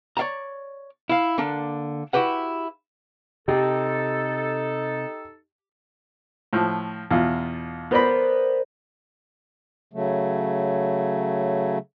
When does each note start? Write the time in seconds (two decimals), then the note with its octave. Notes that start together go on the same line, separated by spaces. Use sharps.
0.17 C#5 D5 F5 A5 A#5
1.09 E4 F5
1.38 D3 A#3 D4
2.13 E4 F#4 G4 B4 F#5
3.48 C3 D#4 G4 A4
6.53 A2 F3
7.11 E2 B2 F4
7.91 B3 A#4 C5 D5 B5
9.93 C#3 F#3 A3